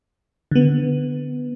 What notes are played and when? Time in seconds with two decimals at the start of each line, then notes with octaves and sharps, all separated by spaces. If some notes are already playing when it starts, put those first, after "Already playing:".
0.51 D3 B3